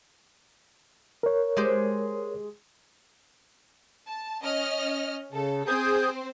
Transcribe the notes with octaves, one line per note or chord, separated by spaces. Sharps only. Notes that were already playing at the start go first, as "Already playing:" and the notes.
A#4 C#5
G#3 G4 C5
A5
C#4 D#5 F6
C#3 A4
C4 G#4 C5 D#6 G6